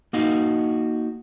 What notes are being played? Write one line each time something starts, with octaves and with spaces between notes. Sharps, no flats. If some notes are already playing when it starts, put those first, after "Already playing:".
A#3 D#4 F#4 D#5 F5